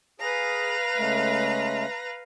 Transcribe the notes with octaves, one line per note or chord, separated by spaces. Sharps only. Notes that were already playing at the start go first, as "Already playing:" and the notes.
G#4 B4 F5 A#5
C#3 G#3 A3